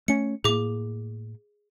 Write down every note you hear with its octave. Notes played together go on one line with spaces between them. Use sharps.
A3 C#4 C#7
A2 A#3 G#4 D6